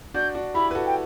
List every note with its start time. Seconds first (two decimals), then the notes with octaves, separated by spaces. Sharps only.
0.14 D4 F#4 G6
0.35 D4 F#4
0.54 E4 G4 B5
0.71 B4
0.75 F#4 A4
0.86 G5